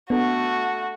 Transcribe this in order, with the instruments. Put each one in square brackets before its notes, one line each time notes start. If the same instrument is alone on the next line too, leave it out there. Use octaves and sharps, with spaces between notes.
[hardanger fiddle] A3 F#4 [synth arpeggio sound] B3 D4 A4